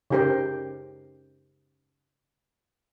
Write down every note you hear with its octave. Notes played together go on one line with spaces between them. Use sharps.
C#3 D#4 G4 A#4 C5